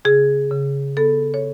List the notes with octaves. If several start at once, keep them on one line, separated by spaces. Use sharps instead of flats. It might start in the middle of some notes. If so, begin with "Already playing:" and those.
C#3 G#4
C#3
B3 A4
C#5